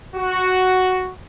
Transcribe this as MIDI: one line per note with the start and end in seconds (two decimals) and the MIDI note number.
0.15 1.10 66